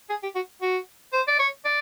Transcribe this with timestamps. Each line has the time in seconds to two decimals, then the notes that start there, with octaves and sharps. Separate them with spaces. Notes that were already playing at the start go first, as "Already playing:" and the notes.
0.09 G#4
0.23 G4
0.35 F#4
0.62 F#4
1.13 C5
1.28 D5
1.39 C#5
1.65 D5